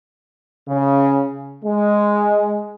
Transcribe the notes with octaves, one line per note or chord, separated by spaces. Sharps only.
C#3
G#3